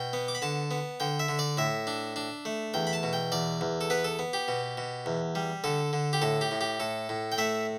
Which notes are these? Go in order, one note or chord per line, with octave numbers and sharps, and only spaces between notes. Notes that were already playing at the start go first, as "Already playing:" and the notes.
Already playing: B2 G5
B3
D6
B5
D3 A5
B3
D3 G5
E5
D3
D5
A2 E5
D4
D4
A3
E2 G5
B5
A5
B2
G5
E2 D5
E2
A4
B3 B4
A4
B3
G4
B2
B2
E2
G3
D3 A4
D3
G4
A2 A4
G4
A2
G4
A2 A4
A2
G5
A3 E5